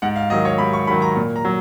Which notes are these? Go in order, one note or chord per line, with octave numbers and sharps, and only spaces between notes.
G#2 F#5
F5
D#3 F#3 D#5
C#5
G#2 B5
C#6
D#3 F#3 B5
A#5
A#2
A#5
F#3